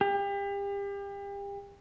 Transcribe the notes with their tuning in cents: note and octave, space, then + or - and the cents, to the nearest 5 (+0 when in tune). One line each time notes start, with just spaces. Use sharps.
G4 +35